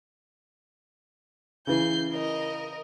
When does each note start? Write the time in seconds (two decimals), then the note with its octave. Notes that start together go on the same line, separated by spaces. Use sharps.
1.67 C#3 E3 G6 C7
2.13 A#4 D#5